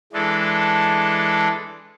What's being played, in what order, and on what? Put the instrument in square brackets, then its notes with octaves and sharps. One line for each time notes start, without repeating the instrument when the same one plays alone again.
[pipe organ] E3 G#3 D4 A4